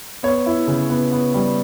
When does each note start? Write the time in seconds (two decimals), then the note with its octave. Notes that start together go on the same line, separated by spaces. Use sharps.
0.23 B3 C#5
0.46 E4
0.67 C#3
0.90 B3
1.12 B3
1.34 G3